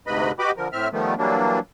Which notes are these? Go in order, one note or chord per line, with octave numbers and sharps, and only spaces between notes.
D2 G#2 C3 B4 D#5 B5
F#4 G4 B4 D#5 B5 D6
D3 F3 A#4
A2 C4 E5 F6
D#3 F3 G3 A3 B3
E3 F#3 G3 A#3 D4